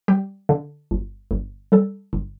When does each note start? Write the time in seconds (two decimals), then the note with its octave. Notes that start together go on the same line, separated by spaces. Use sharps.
0.08 G3 G4
0.49 D3
0.91 G1
1.31 G1
1.72 G3 A4
2.13 G1